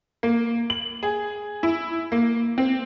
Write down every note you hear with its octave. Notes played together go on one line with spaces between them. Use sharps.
A#3
F#7
G#4
E4
A#3
C4